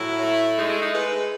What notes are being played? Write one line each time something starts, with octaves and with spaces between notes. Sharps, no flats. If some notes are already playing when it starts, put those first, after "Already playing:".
Already playing: A2 F#3 E4
A3
G#3 D#4
E4
D#4
G#3 B4